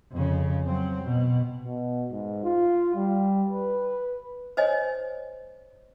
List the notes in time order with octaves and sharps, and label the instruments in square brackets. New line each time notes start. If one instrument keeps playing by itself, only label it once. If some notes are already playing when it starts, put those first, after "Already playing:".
[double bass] F2 C#3
F#3 C4
B2
[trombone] B2
G#2
F4
G3
B4
[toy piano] C5 C#5 D#5 G#5